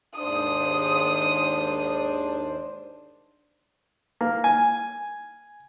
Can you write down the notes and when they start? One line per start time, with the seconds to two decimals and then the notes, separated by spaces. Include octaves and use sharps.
0.19 D#2 G#2 D4 C5 D#6
4.21 A#3
4.44 G#5